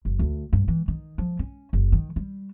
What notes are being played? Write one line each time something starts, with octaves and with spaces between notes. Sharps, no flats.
F#1
D2
G2
E3
D#3
F3
C#4
F#1
D#3
G3